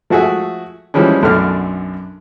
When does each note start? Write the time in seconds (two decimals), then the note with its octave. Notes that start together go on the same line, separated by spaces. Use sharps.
0.10 F3 A3 F#4 G#4 E5
0.94 E3 F3 G3 G#3 C#4
1.22 B1 F#2 D3 A3 D4 F6